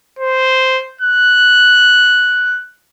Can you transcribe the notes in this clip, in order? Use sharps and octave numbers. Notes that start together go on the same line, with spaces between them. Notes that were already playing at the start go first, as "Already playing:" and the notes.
C5
F#6